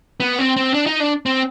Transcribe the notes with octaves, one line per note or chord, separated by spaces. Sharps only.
B3
C4
C4
D4
D#4
D4
C4